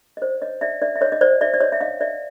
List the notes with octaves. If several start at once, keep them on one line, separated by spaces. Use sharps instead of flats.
D#5
C5 D5
C#5 D#5
D5 E5
D5 E5
E5
C#5 D#5
D#5
C5 D5
D5 E5
D5
C#5 D#5
E5
D#5 F5
D5 E5